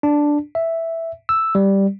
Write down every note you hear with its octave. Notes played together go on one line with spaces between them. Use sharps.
D4
E5
E6
G3